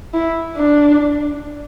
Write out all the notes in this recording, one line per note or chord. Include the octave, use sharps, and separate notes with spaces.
E4
D4